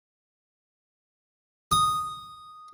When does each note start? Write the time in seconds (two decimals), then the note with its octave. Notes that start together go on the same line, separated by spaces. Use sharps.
1.72 D#6